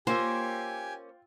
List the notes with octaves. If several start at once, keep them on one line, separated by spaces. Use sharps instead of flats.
A#3 C#4 F4 G4 C5 G5 G#5 E6